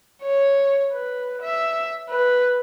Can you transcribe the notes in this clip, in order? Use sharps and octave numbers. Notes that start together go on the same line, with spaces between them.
C#5
B4
E5
B4